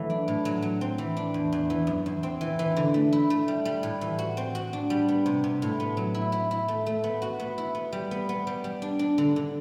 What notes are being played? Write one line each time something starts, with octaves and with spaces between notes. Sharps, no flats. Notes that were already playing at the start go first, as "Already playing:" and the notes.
Already playing: E3 F#3 A3
D4
A2
F#3
F#3
C4
E3
D4
E2
E2
E3
F#2
E2
C4
E3
E3
D3
A3
E4
A3
G3
G3
A2
E3
F#4
C4
F#4
D4
G3
B3
C3
C3
A2
B3
F#3
E4
E4
E4
A3
A3
B3
F#4
B3
E4
B3
G3
B3
B3
G3
G3
D4
D4
D3
D3